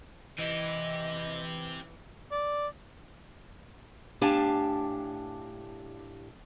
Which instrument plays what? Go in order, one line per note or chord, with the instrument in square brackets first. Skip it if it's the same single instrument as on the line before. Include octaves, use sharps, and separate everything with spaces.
[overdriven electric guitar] E3 [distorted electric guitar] C4 G4 [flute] D#5
[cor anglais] D5
[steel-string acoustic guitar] A2 D4 G4 F5 G#5 A5